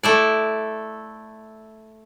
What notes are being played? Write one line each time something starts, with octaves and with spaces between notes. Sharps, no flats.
A3 E4 D5